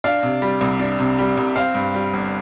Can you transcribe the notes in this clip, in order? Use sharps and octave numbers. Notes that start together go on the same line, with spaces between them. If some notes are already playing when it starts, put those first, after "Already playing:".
D4 F5
C3
G3
C2
D4
C3
G3
C2
C4 F5
G2
G3
G1